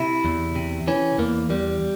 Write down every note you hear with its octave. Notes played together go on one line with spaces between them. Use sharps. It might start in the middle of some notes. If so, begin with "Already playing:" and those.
Already playing: C3 E4
E2
C3
E3 C#4
E2 A#3
E2 G3